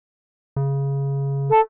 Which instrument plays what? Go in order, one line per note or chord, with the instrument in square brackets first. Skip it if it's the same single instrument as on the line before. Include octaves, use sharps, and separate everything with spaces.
[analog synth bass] C#3
[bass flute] A4